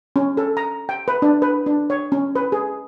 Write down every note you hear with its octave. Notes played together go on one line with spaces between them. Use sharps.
C#4
A4
A#5
G5
B4
D4
B4
D4
C#5
C#4
B4
G#4